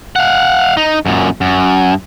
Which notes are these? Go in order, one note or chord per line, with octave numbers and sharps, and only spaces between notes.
F5 F#5
D#4
F#2 A#2
F#2